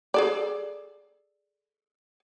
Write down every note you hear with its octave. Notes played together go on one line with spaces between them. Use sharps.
G#4 A4 D5